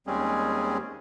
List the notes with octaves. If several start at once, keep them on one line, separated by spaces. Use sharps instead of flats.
D#2 G3 G#3 C4 C#4 G#4